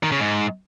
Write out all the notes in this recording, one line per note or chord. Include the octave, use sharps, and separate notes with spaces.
D#3
C#3
G#2